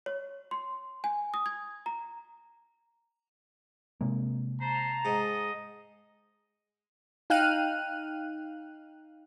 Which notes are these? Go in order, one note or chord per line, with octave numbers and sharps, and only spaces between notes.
C#5
C6
G#5
D#6
G#6
A#5
C3 G#3 A#3
C5 A5 A#5
G#2 D#5
D#4 F5 G5 F6 F#6 D#7